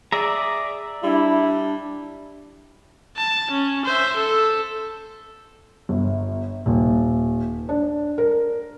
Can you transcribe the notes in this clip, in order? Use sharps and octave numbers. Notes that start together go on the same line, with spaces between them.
G#4 D5 E5 A#5
G3 D4 E4
A5
C#4
C5 E5
A4
G1
D#1
D4
A#4